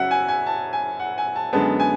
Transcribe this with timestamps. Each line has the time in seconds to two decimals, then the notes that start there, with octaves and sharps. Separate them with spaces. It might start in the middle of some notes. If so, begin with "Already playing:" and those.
Already playing: F#2 C#3 F#3 E5 F#5
0.11 G#5
0.28 G#5
0.47 A5
0.73 G#5
1.00 F#5
1.18 G#5
1.36 A5
1.53 F#2 D3 G#3 B3 A5
1.80 G#5